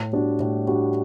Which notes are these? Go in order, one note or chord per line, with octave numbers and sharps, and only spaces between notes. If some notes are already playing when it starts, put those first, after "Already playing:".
Already playing: A2
G3 D4 F#4
A2
G3 D4 F#4